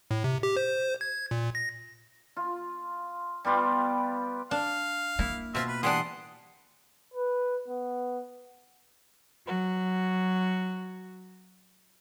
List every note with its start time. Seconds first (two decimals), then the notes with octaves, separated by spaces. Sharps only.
0.11 A2
0.24 C3
0.43 G4
0.56 C5
1.01 G#6
1.31 A#2
1.55 A#6
2.36 F4
3.45 G3 B3 F4 G4
4.51 D4 F5
5.19 A#3 E4
5.55 B2 C4 F4 E5
5.68 B4
5.83 E3 G3 D4 F#5 C6 D#6
7.14 B4
7.68 B3
9.45 F#3 F#4